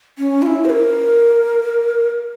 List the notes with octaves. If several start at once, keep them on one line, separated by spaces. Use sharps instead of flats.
C#4
F4
E4
C5
A#4